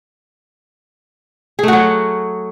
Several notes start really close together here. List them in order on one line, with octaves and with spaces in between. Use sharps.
G#4 A3 F#4 F#3